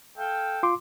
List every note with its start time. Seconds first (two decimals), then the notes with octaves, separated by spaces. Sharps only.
0.17 A4 F5 G5
0.63 F4 C6 D6